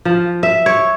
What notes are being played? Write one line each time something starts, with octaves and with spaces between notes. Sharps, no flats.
F3
E5
C#5